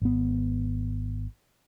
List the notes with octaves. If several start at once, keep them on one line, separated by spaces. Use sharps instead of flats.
G#1 B3